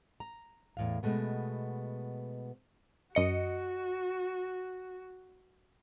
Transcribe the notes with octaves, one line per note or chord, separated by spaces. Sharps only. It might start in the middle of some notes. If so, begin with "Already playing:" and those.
A#5
E2 A2 F5
B2 E3 G#3 A3 B3
F#2 F#4 D#5 C#7